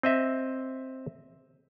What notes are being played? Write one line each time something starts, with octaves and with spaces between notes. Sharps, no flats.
C4 D#5 E5